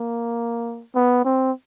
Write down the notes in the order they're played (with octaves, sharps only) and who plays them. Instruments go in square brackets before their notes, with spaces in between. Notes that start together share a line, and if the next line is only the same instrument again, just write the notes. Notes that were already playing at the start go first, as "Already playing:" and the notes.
Already playing: [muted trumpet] A#3
B3
C4